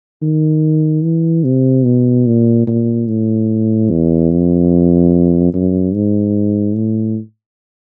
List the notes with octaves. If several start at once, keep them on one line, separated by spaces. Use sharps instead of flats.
D#3
E3
C3
B2
A#2
A#2
A2
E2
F2
F#2
G#2
A2